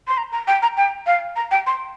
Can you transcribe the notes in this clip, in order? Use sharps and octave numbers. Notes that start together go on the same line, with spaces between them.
C6
A#5
A#5
G5
A#5
G5
F5
A#5
G5
C6